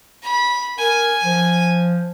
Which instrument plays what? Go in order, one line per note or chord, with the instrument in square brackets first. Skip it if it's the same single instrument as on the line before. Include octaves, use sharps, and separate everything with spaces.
[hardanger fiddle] B5
[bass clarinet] A#4 [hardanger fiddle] G#5
[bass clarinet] F3